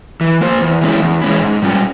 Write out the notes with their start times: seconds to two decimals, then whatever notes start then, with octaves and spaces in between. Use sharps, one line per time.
0.21 E3
0.41 A#3 F4 C5
0.61 E2
0.81 E3 G#3 C#4 E4
1.02 E2
1.22 E3 G#3 C#4 E4
1.42 G#2
1.62 G3 C#4 F4